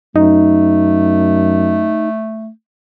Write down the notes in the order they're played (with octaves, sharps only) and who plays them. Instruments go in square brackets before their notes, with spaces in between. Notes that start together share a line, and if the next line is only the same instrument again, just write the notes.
[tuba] F#2 [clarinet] A3 [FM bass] D#4